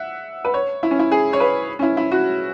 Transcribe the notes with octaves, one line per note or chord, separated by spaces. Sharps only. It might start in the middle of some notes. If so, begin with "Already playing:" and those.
Already playing: E5 F#5
B4
C#5
E4
C#4
E4
G#4
C#5
B4
C#4
E4
E4
F#4